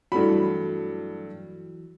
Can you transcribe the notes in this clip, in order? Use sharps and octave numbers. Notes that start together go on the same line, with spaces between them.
G2 E3 F#3 A3 B5